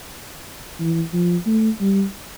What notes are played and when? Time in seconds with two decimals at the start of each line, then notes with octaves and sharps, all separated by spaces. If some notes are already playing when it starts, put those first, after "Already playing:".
0.80 E3
1.13 F3
1.46 A3
1.81 G3